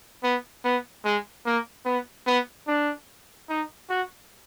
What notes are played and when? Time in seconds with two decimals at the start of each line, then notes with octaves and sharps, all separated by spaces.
0.23 B3
0.64 B3
1.04 G#3
1.45 A#3
1.85 B3
2.26 B3
2.68 D4
3.49 D#4
3.90 F#4